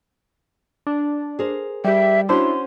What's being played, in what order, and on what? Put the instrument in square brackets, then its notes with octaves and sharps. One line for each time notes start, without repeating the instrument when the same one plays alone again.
[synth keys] D4
[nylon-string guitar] G#4 A#4 C5
[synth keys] G3 G4 [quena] E5
[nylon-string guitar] C#4 F#4 C5 [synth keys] D4 E4 [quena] C6